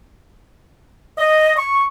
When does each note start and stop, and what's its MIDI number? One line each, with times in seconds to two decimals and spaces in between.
1.18 1.56 75
1.58 1.84 85